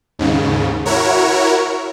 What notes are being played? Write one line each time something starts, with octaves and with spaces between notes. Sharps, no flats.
D#2 G#2 C#3
E4 F#4 A#4 C#5